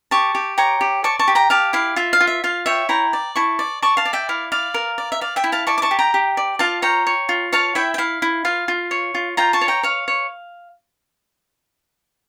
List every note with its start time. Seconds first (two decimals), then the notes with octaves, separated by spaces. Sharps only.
0.11 G4 A5 C#6
0.35 G4
0.58 C#5 G5 A#5
0.81 G4
1.04 D5 A5 C#6
1.19 A5 C#6
1.28 G4
1.35 G5 A#5
1.50 G4 F5 A5
1.73 E4 F5
1.96 F4 E5
2.13 F5
2.20 F4
2.27 E5
2.44 F4 F5
2.66 C#5 E5 G5
2.89 E4 G5 A#5
3.13 D5
3.36 E4 A5 C#6
3.59 D5
3.82 D5 A5 C#6
3.97 F5 A5
4.05 D5
4.13 E5 G5
4.29 E4 F5
4.52 D5 F5
4.74 A#4
4.98 D5
5.12 E5
5.21 D5 F5
5.36 E5 G5
5.44 E4
5.52 F5 A5
5.67 D5 A5 C#6
5.78 D6
5.82 A5 C#6
5.91 G4
5.99 G5 A#5
6.14 G4
6.37 D5
6.59 F4 F5 A5
6.82 C#5 G5 A#5
7.07 C#5
7.29 F4
7.52 C#5 F5 A5
7.75 E4 E5 G5
7.94 G5
7.98 E4 F5
8.22 E4
8.45 F4 F5
8.68 F4
8.91 C#5
9.15 F4
9.37 F4 G5 A#5
9.53 A5 C#6
9.61 C#5
9.68 G5 A#5
9.83 C#5 F5
10.08 C#5